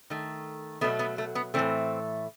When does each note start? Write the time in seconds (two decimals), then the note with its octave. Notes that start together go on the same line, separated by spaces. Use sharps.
0.10 D#3 A3
0.81 B2 F#3 A3 B3
0.99 B3
1.18 A3
1.35 B3
1.54 A2 E3 A3 C4